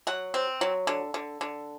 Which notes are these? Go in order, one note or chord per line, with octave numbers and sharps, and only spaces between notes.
F#3 F#5
C4
F#3
D3
D3
D3